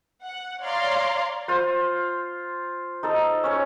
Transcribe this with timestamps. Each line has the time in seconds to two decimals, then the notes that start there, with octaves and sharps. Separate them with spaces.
0.24 F#5
0.62 C#5 D5 F5 A#5 C6
1.48 F4 C5
3.03 D#4 A4
3.44 C#4 C#5